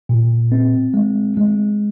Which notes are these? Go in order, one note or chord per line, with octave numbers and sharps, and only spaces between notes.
A#2
C4
G#3
G#3